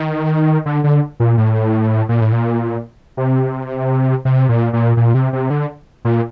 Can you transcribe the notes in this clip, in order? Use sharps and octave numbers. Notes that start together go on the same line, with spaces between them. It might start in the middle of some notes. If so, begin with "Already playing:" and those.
Already playing: D#3
D3
D3
A#2
A2
A#2
A2
A#2
C3
C3
A#2
A#2
A#2
C3
C3
D3
A#2